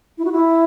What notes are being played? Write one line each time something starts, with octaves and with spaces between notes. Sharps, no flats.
E4
F#4
E4